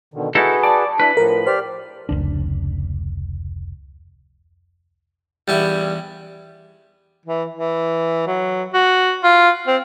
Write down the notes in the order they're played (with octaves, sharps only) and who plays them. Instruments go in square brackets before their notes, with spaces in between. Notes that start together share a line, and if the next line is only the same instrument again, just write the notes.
[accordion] B2 D3 D#3
[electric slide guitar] D#4 E4 A4 [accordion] F#4 G#4 B4
[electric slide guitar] D5 [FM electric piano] A5
[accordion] D4 E4 [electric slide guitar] B4
[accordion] A2 F3 [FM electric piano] A#4
[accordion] G4 D5 F6 [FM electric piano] C5
[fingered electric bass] F1 C#2 D4
[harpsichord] E2 B3 E4 [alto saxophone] G3
[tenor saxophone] E3
E3
F#3
F#4
F4
C4